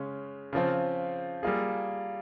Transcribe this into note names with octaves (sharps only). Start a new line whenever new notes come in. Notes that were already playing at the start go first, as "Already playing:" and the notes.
Already playing: C#3 G#3 C#4
C#3 F3 C4 F4
G3 A#3 F4 G#4